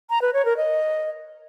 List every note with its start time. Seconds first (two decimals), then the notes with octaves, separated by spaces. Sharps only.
0.10 A#5
0.22 B4
0.33 C#5
0.45 A#4
0.57 D#5